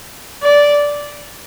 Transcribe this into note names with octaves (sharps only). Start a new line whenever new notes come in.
D5